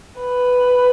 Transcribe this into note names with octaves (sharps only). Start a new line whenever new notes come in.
B4